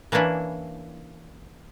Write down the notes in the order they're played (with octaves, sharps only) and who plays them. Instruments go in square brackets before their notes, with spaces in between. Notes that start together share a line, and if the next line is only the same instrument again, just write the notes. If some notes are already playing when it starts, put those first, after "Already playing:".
[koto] E3 A#3 C#4 D4 E4